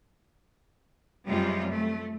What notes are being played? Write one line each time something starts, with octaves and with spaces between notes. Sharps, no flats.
F#2 C3 G3 G#3 F4
A3